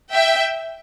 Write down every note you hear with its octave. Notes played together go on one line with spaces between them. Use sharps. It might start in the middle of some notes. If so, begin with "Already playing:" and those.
E5 G5